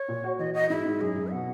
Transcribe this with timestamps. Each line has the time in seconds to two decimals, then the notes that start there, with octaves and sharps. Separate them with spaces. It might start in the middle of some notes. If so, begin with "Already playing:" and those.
Already playing: C#5
0.08 A#2
0.24 F#4
0.39 E3 D#5
0.54 F#4 D#5
0.70 G#2 E4
0.85 G#2
1.01 F#2 G#4
1.16 F#2
1.31 B2 F#5